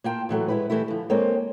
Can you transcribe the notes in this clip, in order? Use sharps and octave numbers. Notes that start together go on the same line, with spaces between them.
A#3 F4 G5 A5
A2 E3 F#3 A3
G#3 E4 B4
E3 G3 A3 E4
D3 F3
G#3 A#3 C4 A4 C#5